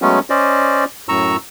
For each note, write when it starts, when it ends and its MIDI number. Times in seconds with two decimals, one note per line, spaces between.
0.02 0.19 54
0.02 0.19 56
0.02 0.19 57
0.02 0.19 59
0.02 0.19 61
0.30 0.85 61
0.30 0.85 72
0.30 0.85 74
0.30 0.85 75
1.09 1.37 42
1.09 1.37 45
1.09 1.37 82
1.09 1.37 85
1.09 1.37 88